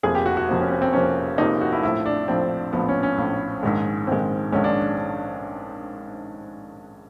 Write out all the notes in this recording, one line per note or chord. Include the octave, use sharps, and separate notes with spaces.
F1 F2 C3 F3 A#3 G#4
G4
F#4
F#4
F1 F2 C3 F3 A#3
C#4
C4
C4
F1 F2 C3 F3 A#3 C#4
F1 F2 C3 F3 A#3 D#4
F#4
E4
A#1 A2 F3 E4
D4
A#1 A2 F3 C4
A#1 A2 F3 B3
C#4
C#4
A#1 A2 F3
A#1 G#2 D#3 G#3
A#1 G#2 D#3 G#3 C4
A#1 G#2 D#3 G#3 C#4
D4